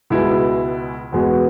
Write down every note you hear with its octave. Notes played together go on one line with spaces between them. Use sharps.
C#2 B2 G#3 E4
E2 B2 G#3 B3 F#4